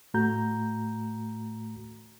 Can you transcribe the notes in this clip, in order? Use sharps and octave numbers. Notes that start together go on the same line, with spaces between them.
A2 A3 F#4 A#5 G6